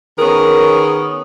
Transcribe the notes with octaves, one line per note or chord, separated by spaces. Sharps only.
D#3 B3 C#4 G#4 A#4